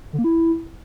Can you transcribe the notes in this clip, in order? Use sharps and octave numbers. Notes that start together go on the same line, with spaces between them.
D3
A#3
E4